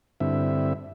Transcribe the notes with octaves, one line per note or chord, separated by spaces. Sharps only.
G2 D3 C4 E4 E5